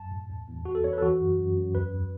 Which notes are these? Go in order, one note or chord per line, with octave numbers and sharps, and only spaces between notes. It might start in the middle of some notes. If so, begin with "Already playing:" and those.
Already playing: F#2 F#3 A5
A2
E2
E2
E2 F#4
A4
E2 C#5
B4
A4
E3 F#4
F#2
F#2
F#2
E2 B4